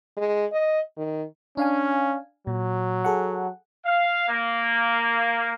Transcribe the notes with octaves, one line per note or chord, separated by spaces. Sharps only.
G#3
D#5
D#3
C#4 D4 F5 G#5
A#2 F#3
G#4 A4 F#5
F5
A#3